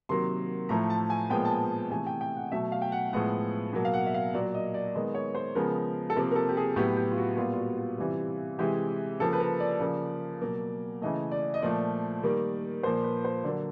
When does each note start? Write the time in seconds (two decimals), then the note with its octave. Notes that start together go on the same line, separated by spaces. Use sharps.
0.09 C3 D#3 F#3 A#3 C6
0.69 A2 F3 A3 A#5
0.90 A5
1.10 G#5
1.30 A#2 F3 G#3 B3 G5
1.45 A5
1.50 G#5
1.90 C3 E3 A3 G#5
2.07 G5
2.21 G5
2.36 F#5
2.52 B2 F#3 A3 E5
2.72 F5
2.82 G5
2.92 F#5
3.13 A2 F3 G#3 B3 F#5
3.73 B2 F#3 A#3
3.85 F5
3.94 F#5
4.06 E5
4.14 F5
4.34 A#2 F#3 A#3 D5
4.54 D#5
4.74 D5
4.94 D#3 G#3 B3 D#5
5.15 C#5
5.35 C5
5.55 C#3 F3 G#3 B3 A#4
6.10 A4
6.16 C3 F3 A#3 A#4
6.31 A#4
6.36 A4
6.49 G4
6.57 G#4
6.76 A2 F#3 B3 G4
6.97 G4
7.12 F4
7.17 F#4
7.37 A#2 G3 B3 F4
7.53 F4
7.57 F#4
7.78 F4
7.98 C3 E3 G3
8.59 C3 E3 G#3 G4
9.20 C#3 F3 A#3 A4
9.33 B4
9.40 A#4
9.60 D5
9.80 C#3 F3 A#3
10.41 B2 F#3 A#3
11.02 C#3 E3 A3 D#5
11.31 D5
11.54 D#5
11.62 A#2 F3 A3 D5
12.23 D#3 G3 A#3
12.83 A#2 F3 A#3 C5
13.04 B4
13.25 C5
13.44 D3 F#3 A#3 D5